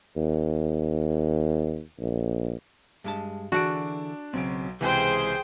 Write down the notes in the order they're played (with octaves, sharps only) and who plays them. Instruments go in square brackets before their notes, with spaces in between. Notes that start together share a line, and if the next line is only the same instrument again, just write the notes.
[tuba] D#2
A#1
[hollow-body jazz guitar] G2 G#3 A5
[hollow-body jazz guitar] D3 E3 G#4 [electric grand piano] D4 A5 D7 [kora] F#4 F#5
[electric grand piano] B1 F#3 D7 [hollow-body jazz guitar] C#3 C4
[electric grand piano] C#2 E3 [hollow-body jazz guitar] C3 [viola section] G#4 C5 G5